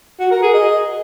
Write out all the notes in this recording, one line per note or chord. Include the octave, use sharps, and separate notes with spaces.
F#4
A#4
G#4
D#5